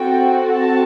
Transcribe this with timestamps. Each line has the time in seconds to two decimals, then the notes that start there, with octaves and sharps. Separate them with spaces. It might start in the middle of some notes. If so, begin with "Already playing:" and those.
Already playing: C4 F#4 A4 G5
0.52 A5